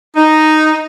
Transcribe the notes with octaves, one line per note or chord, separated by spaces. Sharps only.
D#4